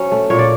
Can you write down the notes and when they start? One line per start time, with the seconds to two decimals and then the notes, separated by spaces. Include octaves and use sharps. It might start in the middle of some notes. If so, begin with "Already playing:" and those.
Already playing: F#3 C#4 C5
0.12 A3
0.30 A#2 C#5
0.39 D5